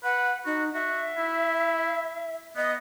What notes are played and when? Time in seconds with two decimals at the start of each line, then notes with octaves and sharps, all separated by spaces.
0.04 B4 F#5
0.45 D#4 F#4
0.74 F#4 E5
1.18 E4
2.56 B3 D#5